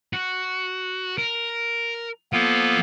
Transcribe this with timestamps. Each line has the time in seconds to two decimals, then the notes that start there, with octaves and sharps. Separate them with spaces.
0.13 F#4
1.18 A#4
2.33 F3 A#3 B3 A4